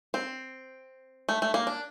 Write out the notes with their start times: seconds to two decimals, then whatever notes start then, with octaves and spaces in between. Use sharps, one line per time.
0.14 C4
1.29 A3
1.42 A3
1.54 A#3
1.67 D4